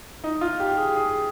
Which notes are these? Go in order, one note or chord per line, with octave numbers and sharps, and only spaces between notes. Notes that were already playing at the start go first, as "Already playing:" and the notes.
D#4
F4
G4
G#4
G#4